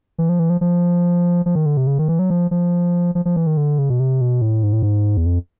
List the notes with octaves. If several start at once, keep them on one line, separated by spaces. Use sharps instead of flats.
E3
F3
E3
F3
F3
F3
D#3
D3
C3
C#3
D#3
E3
F#3
F3
F3
F3
F3
E3
D#3
D3
C#3
B2
C3
B2
A2
G#2
A2
G#2
E2
F2